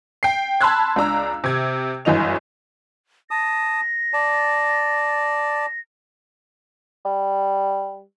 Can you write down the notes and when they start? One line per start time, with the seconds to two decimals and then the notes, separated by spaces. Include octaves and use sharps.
0.23 G5 C7
0.61 A5 B5 C6 E6 F#6 G#6
0.96 C#2 D4 A#5 E6
1.44 C3 G#6
2.05 G1 F#2 E3 D#5 F7
3.31 A5 D#6 A#6
4.13 D5 A5
7.05 G3